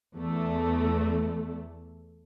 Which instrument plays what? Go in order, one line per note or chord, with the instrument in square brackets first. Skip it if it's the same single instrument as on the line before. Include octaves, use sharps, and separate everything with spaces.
[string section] E2 A3